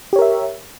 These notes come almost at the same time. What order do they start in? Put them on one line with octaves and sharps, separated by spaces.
G4 C#5 A#4 E5